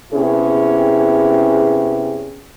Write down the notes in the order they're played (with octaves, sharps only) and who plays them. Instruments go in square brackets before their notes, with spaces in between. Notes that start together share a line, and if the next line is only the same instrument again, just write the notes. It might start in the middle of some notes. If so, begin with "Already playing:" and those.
[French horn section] C3 B3 C#4 E4 G#4